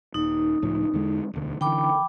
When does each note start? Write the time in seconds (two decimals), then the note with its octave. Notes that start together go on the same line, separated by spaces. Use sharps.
0.14 D#1 D#4
0.62 C#2 A2 F3
0.93 E2 D3 G#3
1.33 E1 D2
1.61 D3 E3 G5 B5 D6